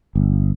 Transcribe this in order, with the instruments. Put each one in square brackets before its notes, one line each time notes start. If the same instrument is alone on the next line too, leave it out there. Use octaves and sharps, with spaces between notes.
[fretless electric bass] G1